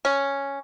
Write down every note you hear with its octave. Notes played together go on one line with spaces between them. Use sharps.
C#4